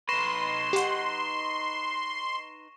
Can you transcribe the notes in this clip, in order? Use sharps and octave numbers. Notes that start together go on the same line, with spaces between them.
D#4 B4 C6 C#6 A#6 E7
G4 F#5